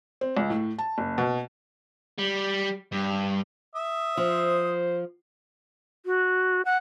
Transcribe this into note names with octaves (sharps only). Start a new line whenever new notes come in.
C4
C#2
A2
A5
F#1
B2
G3
G2
E5 D#6
F3 C5
F#4
F#5